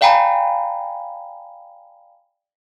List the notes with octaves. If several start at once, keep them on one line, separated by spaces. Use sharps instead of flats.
D5 F5 G5 G#5 A#5 B5